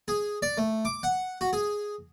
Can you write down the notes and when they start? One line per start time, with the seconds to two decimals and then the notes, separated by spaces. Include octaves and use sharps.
0.08 G#4
0.42 D5
0.57 A3
0.85 D6
1.03 F#5
1.41 F#4
1.53 G#4